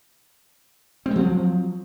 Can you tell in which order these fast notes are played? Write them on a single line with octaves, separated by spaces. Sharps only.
C4 G#3 F3 F#3